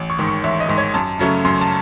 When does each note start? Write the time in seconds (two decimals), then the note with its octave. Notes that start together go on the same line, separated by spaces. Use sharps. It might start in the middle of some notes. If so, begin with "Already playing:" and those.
Already playing: A1
0.10 C#6
0.19 G#2 D#3
0.27 C#6
0.44 A1 E5
0.60 D#5
0.69 G#2 D#3
0.78 C#5
0.94 F#2 A5
1.19 C#3 F#3 A3 C#4
1.45 F#2 C6
1.61 A5